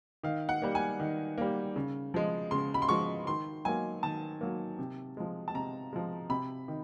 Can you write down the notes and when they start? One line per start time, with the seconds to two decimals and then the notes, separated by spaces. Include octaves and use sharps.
0.23 D#3 F5
0.49 F#5
0.62 G3 A#3
0.75 G#5
1.00 D#3
1.38 G3 A#3
1.76 C#3
2.14 F3 G#3
2.51 C#3 C6
2.74 B5
2.82 C6
2.89 F3 G#3 C#6
3.27 D#3 C6
3.65 F#3 A#3 G#5
4.03 D#3 A5
4.41 F#3 A#3
4.79 C3
5.17 F3 G#3
5.48 A5
5.54 C3 A#5
5.93 F3 G#3
6.29 C3 B5
6.68 D#3